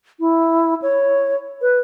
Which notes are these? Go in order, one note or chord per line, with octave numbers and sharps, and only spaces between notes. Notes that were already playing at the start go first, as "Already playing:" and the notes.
E4
C#5
B4